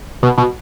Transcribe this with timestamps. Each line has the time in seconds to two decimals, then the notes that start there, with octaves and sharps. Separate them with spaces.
0.23 B2
0.38 B2